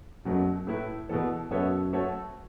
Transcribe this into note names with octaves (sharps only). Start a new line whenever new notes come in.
F#2 B2 F#3 A3
A2 A3 E4 B4
E2 B2 B3 A4
F#2 B2 B3 A4 C#5 E5
A3 F#4 A4 C#5